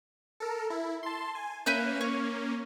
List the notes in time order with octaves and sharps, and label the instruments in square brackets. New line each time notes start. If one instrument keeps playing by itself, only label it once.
[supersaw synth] A4 A#4
E4
A5 C6
G#5
[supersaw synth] A#3 C#4 [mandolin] B4 E5 G6
[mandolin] C#5